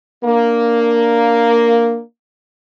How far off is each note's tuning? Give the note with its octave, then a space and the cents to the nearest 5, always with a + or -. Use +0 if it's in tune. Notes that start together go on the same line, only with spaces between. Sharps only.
A#3 +0 D4 +0